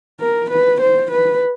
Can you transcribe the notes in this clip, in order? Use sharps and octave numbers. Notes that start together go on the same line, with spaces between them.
A#4
B4
C5
B4